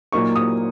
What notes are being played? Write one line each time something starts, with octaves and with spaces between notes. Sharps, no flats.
A#2 F#3 A#3 D#4 C#6
D#6